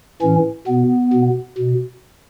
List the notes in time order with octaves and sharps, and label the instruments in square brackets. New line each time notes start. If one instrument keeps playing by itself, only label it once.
[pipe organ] A2 E3 C#4
B2 B3
B2
B2